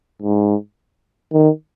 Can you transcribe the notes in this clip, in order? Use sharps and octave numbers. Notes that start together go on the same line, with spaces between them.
G#2
D#3